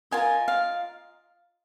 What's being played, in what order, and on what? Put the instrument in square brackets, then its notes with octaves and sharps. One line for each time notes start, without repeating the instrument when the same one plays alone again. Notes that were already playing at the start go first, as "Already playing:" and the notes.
[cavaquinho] F4 A#4 D#5 G#5
F5